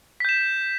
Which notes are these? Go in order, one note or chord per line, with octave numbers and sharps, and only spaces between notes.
G6 B6 E7